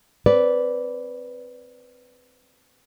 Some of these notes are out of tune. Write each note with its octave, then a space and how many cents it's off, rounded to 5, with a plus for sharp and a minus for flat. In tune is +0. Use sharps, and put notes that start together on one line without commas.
C4 +0 B4 +0 D5 -15